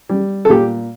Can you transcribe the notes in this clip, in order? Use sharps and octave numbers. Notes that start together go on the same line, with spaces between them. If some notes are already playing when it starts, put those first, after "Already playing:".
G3
A4
A#2 G4